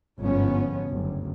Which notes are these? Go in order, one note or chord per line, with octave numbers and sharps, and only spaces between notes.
G1 G#2 F3 B3 C#4
F#1 D2 G2